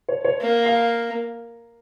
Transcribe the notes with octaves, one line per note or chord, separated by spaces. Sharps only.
C#5
C#5
A#3
F5